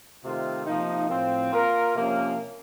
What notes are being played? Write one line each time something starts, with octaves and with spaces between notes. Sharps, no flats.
C3 D#3 A3 C4 F4
C3 F3 A#3 D#4
A2 F3 C4
A#3 F4 A#4
C3 F3 A#3 C#4